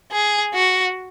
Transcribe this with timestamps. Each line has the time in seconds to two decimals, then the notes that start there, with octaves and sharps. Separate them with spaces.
0.12 G#4
0.54 F#4